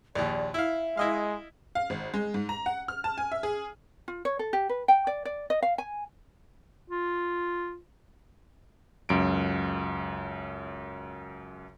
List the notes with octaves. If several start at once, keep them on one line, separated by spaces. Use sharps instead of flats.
A#1 D#2 D5
E4 E5 F5
G#3 E4 D#5 F5
F5
G#1
G#3
G#2
A#5
F#5
F6
A5
G#5
E5
G#4
F4
C#5
A4
G4
B4
G5
D5
D5
D#5
F5
G#5
F4
C#2 F#2 D7